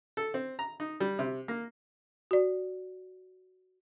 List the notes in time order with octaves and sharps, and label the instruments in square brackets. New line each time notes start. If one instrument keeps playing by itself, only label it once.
[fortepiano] A4
C4
A#5
D#4
G3
C3
A#3
[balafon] F#4 D5